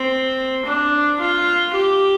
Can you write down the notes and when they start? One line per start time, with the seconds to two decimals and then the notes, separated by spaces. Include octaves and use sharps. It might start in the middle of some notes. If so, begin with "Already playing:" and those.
Already playing: C4
0.65 D4
1.19 F4
1.73 G4